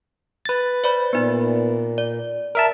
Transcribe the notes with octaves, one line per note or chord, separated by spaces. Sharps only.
B4 A6
C5 D5 B5
A#2 B3 D#4
D5
A#4 E5 A5